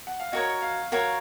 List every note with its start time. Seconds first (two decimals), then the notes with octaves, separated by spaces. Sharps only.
0.07 F#5
0.20 F5
0.32 F#4 A#4 C#5 D#5
0.62 F5
0.92 F#4 A#4 C#5 F5